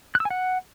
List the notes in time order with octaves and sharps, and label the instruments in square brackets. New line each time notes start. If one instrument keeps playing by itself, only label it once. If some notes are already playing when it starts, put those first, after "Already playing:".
[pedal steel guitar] F#6
E6
G#5
F#5